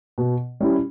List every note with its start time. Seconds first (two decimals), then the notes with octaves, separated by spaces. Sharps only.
0.18 B2
0.60 G3 C#4 E4 G4